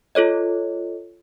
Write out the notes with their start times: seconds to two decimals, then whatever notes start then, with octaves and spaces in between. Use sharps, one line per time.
0.15 F4 A4 C#5 D#5